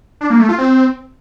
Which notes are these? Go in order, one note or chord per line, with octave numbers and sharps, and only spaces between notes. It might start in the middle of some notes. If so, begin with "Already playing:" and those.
D4
A#3
A3
F4
C4